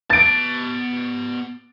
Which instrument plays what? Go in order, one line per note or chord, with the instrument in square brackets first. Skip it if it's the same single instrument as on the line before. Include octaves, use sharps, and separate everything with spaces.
[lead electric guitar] B3 A5 [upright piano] A6 D7